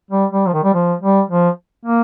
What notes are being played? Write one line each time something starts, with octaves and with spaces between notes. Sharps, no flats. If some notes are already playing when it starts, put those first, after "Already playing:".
G3
G3
F3
D#3
G3
F3
G3
F3
A#3